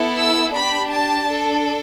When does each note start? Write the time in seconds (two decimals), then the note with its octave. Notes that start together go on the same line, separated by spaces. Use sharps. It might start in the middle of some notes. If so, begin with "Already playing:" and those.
Already playing: B3 E4 A4
0.18 E6
0.54 D4 G4 B5
0.91 A5
1.27 D4 A4